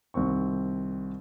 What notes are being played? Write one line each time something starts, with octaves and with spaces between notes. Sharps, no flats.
C2 D#3 C4 C#6